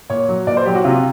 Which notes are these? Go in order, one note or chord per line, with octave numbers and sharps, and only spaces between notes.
A#2 C#5
F#3
A#2 D5
C5
F#3 G4
F#4
C3 F4